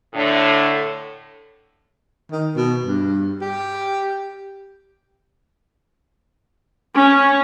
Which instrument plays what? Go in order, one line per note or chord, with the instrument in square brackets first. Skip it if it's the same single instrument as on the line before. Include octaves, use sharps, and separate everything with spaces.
[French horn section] A2 D3
[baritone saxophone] D#3
B2
G2
G4
[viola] C#4